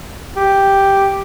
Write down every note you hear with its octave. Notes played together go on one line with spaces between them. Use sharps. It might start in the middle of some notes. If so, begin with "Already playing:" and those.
G4